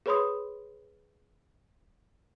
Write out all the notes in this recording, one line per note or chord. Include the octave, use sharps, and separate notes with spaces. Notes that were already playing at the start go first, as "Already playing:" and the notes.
G#4 B4 C#5 B5 C6 D#6